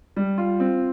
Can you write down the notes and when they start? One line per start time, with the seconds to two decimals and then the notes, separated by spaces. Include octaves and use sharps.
0.16 G3
0.38 F4
0.60 C4